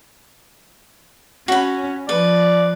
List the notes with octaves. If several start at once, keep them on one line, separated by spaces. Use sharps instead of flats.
C#4 F#4 B5
F3 B4 D5